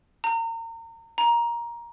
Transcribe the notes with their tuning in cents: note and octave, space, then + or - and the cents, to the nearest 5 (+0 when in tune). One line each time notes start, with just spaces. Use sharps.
A#5 -35
A#5 +15